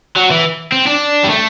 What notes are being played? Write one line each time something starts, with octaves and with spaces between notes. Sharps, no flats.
F#3
E3
C4
D4
G3
A3